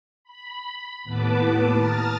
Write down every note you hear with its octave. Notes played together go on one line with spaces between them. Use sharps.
B5
D#2 A2 B3 B4 A5 D6
A5 A#5 D#6 F6 A6